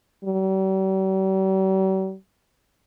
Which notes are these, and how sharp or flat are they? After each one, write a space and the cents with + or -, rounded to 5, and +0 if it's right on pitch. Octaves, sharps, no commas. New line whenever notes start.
G3 -45